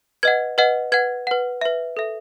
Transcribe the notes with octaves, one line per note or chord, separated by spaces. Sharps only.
B4 D#5 F#5 G#6
B4 D#5 F#5
B4 F#5 G#6
B4 F#5
B4 E5
A4 E5